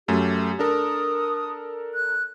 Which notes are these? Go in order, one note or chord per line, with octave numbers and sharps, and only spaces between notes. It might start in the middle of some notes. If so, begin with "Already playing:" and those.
F#2 A3 G4
D4 A4 A#4 D#6
F#6